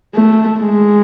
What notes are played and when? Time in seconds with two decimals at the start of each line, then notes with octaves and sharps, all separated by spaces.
0.15 A3
0.59 G#3